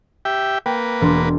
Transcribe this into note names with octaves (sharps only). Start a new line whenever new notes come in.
G4 E5 G5
A#3 B4 G5
E1 D4 C6